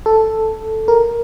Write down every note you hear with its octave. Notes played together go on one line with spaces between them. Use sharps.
A4
A#4